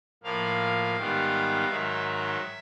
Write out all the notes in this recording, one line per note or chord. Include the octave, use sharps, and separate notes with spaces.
A2 F3 A#3 F5
G#2 D#3 G3 B3
G#2 D#3 F#3 E5